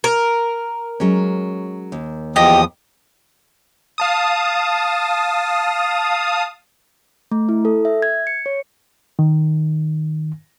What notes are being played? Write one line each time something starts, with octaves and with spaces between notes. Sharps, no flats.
A#4
F#3 G#3 C#4
D#2
E2 F3 G4 D#5 D#6
F5 A5 D#6
A3
E4
A4
E5
G#6
C#7
C#5
D#3